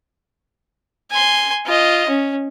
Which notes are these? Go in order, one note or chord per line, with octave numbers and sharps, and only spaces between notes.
G#5 C6
F4 D#5
C#4